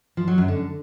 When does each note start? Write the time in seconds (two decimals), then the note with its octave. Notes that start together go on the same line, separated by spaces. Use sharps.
0.17 F3
0.28 F#3
0.38 F#2
0.48 D3